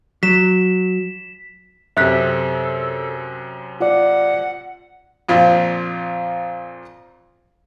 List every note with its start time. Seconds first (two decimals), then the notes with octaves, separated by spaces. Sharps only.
0.23 F#3 B6 E7
1.97 F#2 C3 A4 E5 F#6 B6
3.80 F4 D5 F#5
5.29 F2 A#2 F3